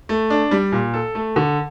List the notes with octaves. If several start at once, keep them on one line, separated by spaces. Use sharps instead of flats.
A3
D4
G3
A#2
A4
A3
D3